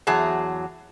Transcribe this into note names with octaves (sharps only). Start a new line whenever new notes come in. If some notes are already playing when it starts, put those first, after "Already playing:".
E2 F#3 F#4 G#4 A5